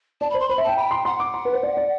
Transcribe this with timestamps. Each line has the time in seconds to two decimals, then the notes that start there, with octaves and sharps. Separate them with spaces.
0.21 D5 A5
0.30 B5
0.34 C5
0.39 C6
0.49 C5 B5
0.58 E5
0.63 G5 A5
0.77 G5 B5
0.91 C6
1.05 F#5 C6
1.20 D6
1.34 C6
1.45 B4
1.53 C5
1.63 D5
1.77 D5